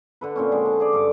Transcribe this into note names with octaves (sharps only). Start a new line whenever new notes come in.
D3 A4 B4
A#2 C4 C#4
D3 G#3
A5
G#4 D5
G2 A4 D6